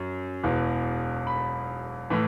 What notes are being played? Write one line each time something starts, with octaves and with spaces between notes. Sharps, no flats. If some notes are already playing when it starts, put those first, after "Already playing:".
Already playing: F#2
E1 E2 E3
B5
A2 E3